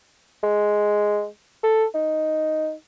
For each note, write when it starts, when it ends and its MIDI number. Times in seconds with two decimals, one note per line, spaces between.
0.44 1.26 56
1.63 1.85 69
1.95 2.73 63